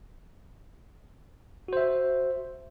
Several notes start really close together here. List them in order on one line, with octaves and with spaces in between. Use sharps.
F#4 C5 E5